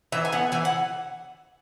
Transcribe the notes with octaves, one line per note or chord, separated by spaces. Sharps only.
E3 E5
G#5
B3 F#5
E3 G#5
F#5